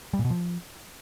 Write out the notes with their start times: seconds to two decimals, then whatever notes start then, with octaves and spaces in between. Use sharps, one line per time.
0.13 G3
0.19 A#2
0.25 B2
0.30 F3